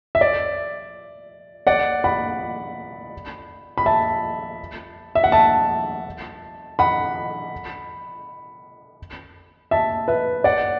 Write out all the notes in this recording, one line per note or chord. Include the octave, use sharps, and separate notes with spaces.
E5
D5
D5 F#5
F#5 B5
B5
E5 A5
E5
F#5
E5 A5
F#5 B5
E5 A5
B4 E5
D5 F#5